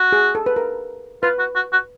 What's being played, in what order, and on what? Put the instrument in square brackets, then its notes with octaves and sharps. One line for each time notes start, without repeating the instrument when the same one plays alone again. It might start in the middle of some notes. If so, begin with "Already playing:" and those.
Already playing: [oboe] F#4
[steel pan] G#4
A4
B4
A#4
[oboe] F4 [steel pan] B4
[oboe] F#4
F#4
F#4